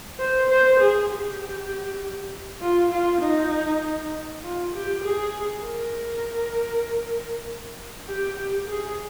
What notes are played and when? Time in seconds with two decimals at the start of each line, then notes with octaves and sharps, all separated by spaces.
0.19 C5
0.49 C5
0.80 G#4
1.09 G4
2.61 F4
2.91 F4
3.21 D#4
4.43 F4
4.74 G4
5.04 G#4
5.65 A#4
8.07 G4
8.37 G4
8.67 G#4